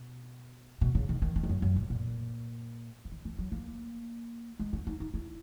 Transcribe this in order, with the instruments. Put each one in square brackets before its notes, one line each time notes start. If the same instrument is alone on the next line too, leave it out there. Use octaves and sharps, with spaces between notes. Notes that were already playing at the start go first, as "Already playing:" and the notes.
Already playing: [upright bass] B2
B2
C#3
D#3
D#3
D#3
E2
F#2
F#2
A#2
A#2
E3
D#3
E3
F#3
A#3
G#3
C#4
D#4
D#4
E4